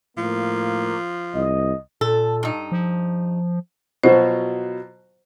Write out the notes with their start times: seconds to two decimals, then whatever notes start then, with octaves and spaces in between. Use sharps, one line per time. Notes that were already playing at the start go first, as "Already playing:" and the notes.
0.17 A2 F3 A#3
1.34 C2 D#5
2.01 A#2 A4
2.43 G2 D#4
2.72 F3
4.03 B2 F3 F#3 C5